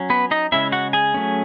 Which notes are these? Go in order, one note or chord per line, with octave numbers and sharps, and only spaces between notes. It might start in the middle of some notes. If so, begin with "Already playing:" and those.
Already playing: F#3 C#4
B3 B4
D#4 D#5
C#3 G#3 C#4 E4 E5
F#4 F#5
G#4 G#5
F#3 A3 C#4